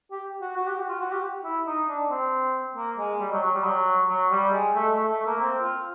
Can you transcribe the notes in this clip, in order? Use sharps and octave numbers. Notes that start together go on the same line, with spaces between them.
G4
F#4
F#4
G4
F#4
F4
F#4
G4
E4
D#4
D4
C4
A#3
G#3
G3
F#3
F#3
G3
F#3
F#3
G3
G#3
A3
A3
A3
A#3
C4
F4